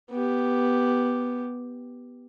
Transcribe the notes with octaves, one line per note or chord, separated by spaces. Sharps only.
B3 G4